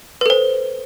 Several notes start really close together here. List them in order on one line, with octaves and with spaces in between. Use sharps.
B4 A4 C5